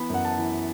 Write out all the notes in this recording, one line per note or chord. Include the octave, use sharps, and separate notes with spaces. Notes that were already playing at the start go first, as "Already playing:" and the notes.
Already playing: E3 B3 B5
F#2 F#5
A5
E3